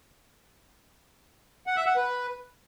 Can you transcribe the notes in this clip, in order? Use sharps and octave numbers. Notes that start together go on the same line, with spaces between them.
F#5
E5
F#5
B4